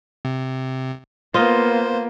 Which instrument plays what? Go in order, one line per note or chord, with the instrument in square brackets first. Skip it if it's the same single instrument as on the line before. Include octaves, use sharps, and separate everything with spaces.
[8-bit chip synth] C3
[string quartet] A#3 B3 [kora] F4 D#5 [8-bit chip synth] C5